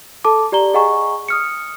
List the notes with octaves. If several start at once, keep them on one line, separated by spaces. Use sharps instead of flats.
A4 A5 D6
G4 D5 A#5 G7
G#4 D#5 F#5 G#5 A#5 C#6
D#6 F6 C#7